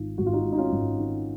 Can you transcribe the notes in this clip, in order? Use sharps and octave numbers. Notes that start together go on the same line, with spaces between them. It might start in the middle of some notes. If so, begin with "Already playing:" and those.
Already playing: G#1 G#2 D#3 F4
G#1 F#4
F4
D#4 F#4
G#2
D#4
C#4 F4
G#1
D#3